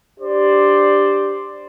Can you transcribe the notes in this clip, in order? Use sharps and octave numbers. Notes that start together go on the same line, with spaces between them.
D4 G4 C5 D5